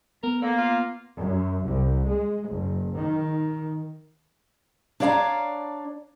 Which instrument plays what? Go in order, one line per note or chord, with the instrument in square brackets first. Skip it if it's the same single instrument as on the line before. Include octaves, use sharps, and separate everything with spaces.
[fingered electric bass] B3 [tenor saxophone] A#4
[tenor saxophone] D3 [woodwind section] A#3
[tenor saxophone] F4
[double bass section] F#2
C2
G#3
F#1
D#3
[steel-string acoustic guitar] D4 C#5 D5 F5 A#5